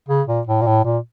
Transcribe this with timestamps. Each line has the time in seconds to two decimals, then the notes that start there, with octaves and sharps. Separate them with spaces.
0.08 C#3
0.28 A#2
0.47 A2
0.61 A#2
0.67 A2
0.84 A#2